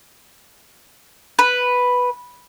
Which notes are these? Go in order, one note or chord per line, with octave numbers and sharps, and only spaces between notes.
B4